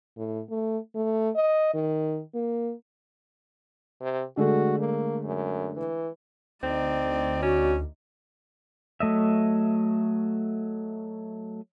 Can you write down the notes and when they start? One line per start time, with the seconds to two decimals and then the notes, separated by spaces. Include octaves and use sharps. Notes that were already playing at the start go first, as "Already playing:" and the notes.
0.17 A2
0.50 A3
0.95 A3
1.35 D#5
1.74 D#3
2.34 A#3
4.01 C3
4.37 D3 G#3 A3 F#4
4.79 A#3
5.24 F#2
5.77 E3
6.63 D2 C4 D#4 D5
7.42 C#4 F#4
9.00 F#3 A3 D#5 E5